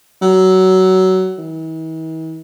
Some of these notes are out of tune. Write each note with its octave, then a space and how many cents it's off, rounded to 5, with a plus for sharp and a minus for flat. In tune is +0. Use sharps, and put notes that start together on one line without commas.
F#3 +20
E3 -45